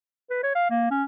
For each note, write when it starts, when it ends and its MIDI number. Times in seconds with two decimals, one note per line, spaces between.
0.30 0.41 71
0.43 0.50 73
0.55 0.68 77
0.70 0.87 58
0.91 1.04 61